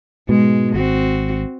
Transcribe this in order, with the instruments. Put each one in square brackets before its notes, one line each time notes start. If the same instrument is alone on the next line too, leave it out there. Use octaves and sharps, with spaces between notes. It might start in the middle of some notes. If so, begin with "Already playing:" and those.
[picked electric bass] G#2 B2 [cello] G#3
[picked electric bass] G#1 [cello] C4 F#4